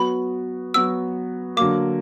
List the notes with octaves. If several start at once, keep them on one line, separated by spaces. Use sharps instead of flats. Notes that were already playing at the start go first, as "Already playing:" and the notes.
Already playing: F#3 B3 F#4 B5
F#3 B3 F#4 E6
D3 F#3 A#3 D6